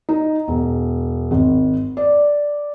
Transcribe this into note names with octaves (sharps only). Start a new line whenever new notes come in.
D#4
E1
G#1
D5